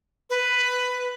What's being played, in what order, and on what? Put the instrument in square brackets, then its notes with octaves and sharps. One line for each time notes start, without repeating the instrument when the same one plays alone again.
[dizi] B4